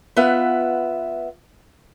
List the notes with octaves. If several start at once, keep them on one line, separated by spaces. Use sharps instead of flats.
B3 F4 E5 F#5